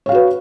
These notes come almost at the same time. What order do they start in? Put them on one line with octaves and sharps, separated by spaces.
C#5 F5 F#4 B4